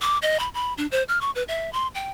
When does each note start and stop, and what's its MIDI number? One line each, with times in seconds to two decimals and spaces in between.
0.02 0.18 86
0.22 0.40 75
0.40 0.49 83
0.54 0.74 83
0.78 0.87 62
0.92 1.03 72
1.08 1.19 89
1.21 1.31 85
1.35 1.43 71
1.48 1.72 76
1.73 1.87 84
1.95 2.11 79